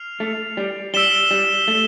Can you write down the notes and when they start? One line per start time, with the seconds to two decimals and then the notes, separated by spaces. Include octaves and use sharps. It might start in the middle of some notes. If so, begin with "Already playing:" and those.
Already playing: F6 C7 F7
0.20 A3
0.57 G3
0.94 G3 E6 B6 E7 G7
1.31 G3
1.68 A3